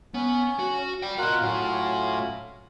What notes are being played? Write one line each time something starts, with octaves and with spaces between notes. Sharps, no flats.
B3 C#4
F#4
D5 G5
F4 F#4 A#4 D#5 F#5
A2 F#3 C#4 F4